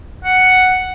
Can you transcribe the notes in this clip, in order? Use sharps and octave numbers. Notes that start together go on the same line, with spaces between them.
F#5